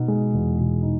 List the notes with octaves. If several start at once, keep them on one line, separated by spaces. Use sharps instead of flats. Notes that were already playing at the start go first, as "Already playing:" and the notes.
Already playing: B2 D#4
G#3
E2
B2
D#4